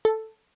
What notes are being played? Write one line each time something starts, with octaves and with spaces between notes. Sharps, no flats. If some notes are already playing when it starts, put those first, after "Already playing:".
A4